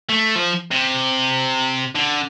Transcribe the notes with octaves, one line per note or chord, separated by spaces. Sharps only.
A3
F3
C3
D3